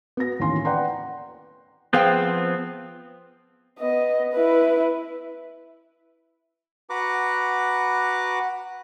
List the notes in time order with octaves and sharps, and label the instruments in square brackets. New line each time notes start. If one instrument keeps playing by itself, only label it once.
[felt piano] B3 F#4 A#6
D#2 A2 E3 A#3 C#4 C6
B4 D5 F#5 G5 A#5 C6
[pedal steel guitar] F3 B3 C4 [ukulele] G#4 F5 G5
[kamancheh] B3 D#5
E4 B4
[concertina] F#4 B4 F#5 A#5 D6